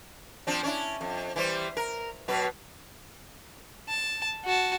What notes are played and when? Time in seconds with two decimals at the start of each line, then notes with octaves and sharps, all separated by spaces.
0.47 F3 C4 D4
0.63 C#4 D4 E4
1.01 F2
1.36 E3 G3 C5
1.77 A#4
2.28 B2 F#3 B4
3.88 A5
4.45 F#4 A5